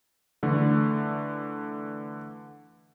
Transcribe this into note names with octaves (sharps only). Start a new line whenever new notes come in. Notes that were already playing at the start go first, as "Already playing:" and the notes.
D3 E3 A3